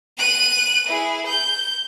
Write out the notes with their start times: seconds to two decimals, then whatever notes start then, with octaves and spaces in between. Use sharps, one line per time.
0.18 F#6 D#7
0.87 E4 G#4
1.26 G6